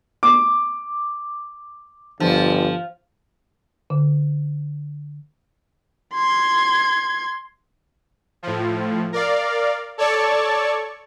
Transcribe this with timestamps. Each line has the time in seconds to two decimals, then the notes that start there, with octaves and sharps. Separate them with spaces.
0.23 D6
2.20 G1 F3
3.90 D3
6.15 C6 G#6
8.43 A2 F3
9.12 A#4 D5 F5
9.98 A4 C#5 D5 A5 C#6